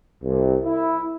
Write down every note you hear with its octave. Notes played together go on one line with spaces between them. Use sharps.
C2
E4